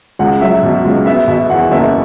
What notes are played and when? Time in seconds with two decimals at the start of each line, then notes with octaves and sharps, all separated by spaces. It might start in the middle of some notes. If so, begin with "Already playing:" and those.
0.19 C#2 F#5
0.41 F#3 E5
0.63 B2
0.85 C#2
1.06 B3 E5
1.27 B2 E5
1.50 E2 F#5
1.71 F#1 E5